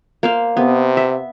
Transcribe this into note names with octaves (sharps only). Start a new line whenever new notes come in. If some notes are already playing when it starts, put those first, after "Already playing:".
A#3 C5 F5
C3 B3
E5